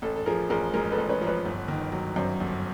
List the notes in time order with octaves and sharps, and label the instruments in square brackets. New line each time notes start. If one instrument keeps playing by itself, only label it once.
[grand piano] A1 [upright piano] A4
[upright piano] A4
[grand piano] F3 [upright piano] G#4 A#4
[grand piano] A1 [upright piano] G#4 A#4
[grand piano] G#2 [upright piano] G#4 A#4
[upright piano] A4 B4
[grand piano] A1
[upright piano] B4 C#5
[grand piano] F3
[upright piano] B4 C#5
[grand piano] G1
D#3
F#3
[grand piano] F#2 [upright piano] C5 D5
[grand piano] G1